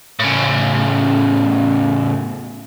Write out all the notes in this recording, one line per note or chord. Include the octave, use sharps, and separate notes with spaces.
A2 C#3